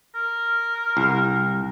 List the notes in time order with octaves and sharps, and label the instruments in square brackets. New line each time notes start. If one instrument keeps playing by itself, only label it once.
[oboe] A#4
[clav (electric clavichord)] C2